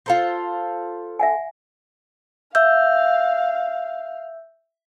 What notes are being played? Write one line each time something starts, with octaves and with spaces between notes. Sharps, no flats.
F4 A4 C5
E5 F#5 G#5
E5 F5 E6 G6